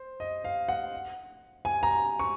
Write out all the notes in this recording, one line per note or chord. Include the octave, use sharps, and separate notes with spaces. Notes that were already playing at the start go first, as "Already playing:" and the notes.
Already playing: C5
D#5
F5
F#5
G#5
A#5
C#6